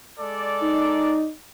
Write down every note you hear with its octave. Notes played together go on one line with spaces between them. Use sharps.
G#3 A4 D5
D#4